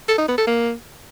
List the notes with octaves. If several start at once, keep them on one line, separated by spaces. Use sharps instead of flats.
A4
D#4
B3
A4
A#3